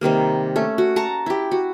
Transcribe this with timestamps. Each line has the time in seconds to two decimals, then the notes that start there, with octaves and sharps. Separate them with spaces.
0.01 C3 D#3 G3 A#3
0.56 A3 C#4
0.78 F#4
0.96 A5 A#5 C#6
1.26 E4 G4
1.51 F#4